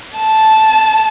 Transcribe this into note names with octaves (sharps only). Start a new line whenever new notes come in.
A5